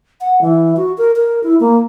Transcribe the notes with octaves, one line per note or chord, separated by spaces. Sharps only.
F#5
E3
F#4
A#4
A#4
E4
A#3